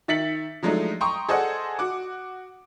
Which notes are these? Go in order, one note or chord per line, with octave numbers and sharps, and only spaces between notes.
D#3 E5 A6 B6 C#7 F#7
F3 F#3 G#3 A3 D4 D#4
G5 A#5 C6 C#6 D#6
G#4 A4 C5 D5 D#5 F#5
F#4 F#5 D6